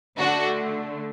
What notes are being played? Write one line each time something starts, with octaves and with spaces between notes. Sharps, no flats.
D3 A3 D4 F#4